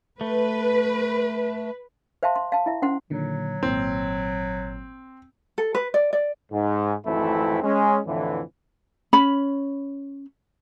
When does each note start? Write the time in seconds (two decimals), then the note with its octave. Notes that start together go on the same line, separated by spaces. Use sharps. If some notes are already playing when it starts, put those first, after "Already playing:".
0.21 A3 B4
2.23 C5 E5 F5 A5 C6
2.36 C6
2.52 F5 A5
2.66 E4 E5
2.82 C#4 C5 F#5 C6
3.10 A#2 D3 D#3 F#3
3.63 G#1 A#2 C4
5.58 A4
5.75 B4
5.94 D5
6.13 D5
6.52 G#2
7.06 G#1 F2 E3 A3 C4 E4
7.63 G#3 C#4
8.06 F2 A2 D3 E3
9.13 C#4 B5